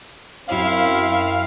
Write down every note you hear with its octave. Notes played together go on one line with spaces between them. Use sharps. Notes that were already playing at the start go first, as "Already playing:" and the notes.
F#2 C4 E4 F5